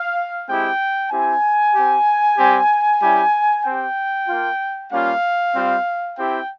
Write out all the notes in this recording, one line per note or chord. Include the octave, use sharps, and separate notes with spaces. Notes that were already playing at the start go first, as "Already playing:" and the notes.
Already playing: F5
G#3 C4 E4 G4 G5
C4 E4 G4 G#5
C4 G4
G3 C4 G4
G3 C#4 E4 G4
C4 G4 G5
A#3 F4
G3 A#3 C#4 F4 F5
G3 C4 F4
C4 E4 G4 G5